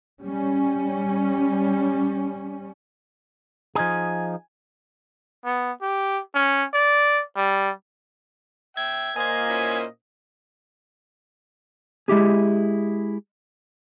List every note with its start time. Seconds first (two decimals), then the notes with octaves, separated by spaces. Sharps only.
0.24 G3 C#4
3.75 F3 D#4 G#4 G#5 G#6
5.45 B3
5.82 G4
6.35 C#4
6.74 D5
7.37 G3
8.77 E5 G5 G#6
9.16 A#2 A#3 C5 D#5 G#5 G#6
9.49 C#4 E4 C5
12.08 G#3 E4 G4 G#4